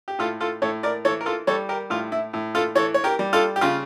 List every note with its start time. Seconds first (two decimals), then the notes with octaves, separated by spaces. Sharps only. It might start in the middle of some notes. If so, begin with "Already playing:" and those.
0.08 G4
0.19 A2 F4 A4
0.40 F4 A4
0.62 A2 A4 C#5
0.83 A#4 D5
1.05 E3 A4 C#5
1.21 A#4
1.26 F4 A4
1.47 G3 A4 C#5
1.69 G4 A#4
1.90 A2 F4
2.12 E4
2.33 A2
2.55 F4 A4
2.75 E3 A4 C#5
2.94 C#5
3.04 G4 A#4
3.19 G3
3.33 F4 A4
3.56 G4
3.61 C#3 F4